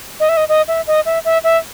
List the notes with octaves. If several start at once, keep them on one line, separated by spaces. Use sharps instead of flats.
D#5
E5
D#5
D#5
E5
D#5
E5
E5
E5